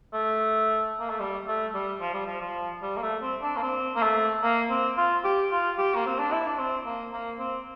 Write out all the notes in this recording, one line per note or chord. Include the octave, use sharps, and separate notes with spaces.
A3
A#3
A3
G3
A3
G3
F3
G3
F3
F3
G3
A#3
A3
C4
D4
A#3
C4
A#3
A3
A#3
C4
F4
G4
F4
G4
A#3
C4
D4
E4
D4
C4
A#3
A#3
C4